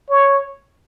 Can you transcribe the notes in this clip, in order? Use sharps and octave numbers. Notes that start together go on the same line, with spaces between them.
C#5